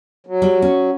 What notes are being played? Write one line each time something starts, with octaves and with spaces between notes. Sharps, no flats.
F#3
G3
C#4